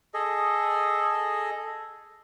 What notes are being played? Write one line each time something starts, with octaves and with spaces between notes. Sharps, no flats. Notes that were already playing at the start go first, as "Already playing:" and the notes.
G#4 A4 D#5